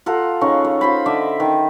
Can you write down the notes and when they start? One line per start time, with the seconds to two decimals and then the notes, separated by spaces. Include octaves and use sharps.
0.06 F4 A4 F#5 A#5
0.41 C#3 D#4 C#6
0.65 C#5
0.81 F4 C5 B5
1.06 D3 D#5 E5 D6
1.40 D#3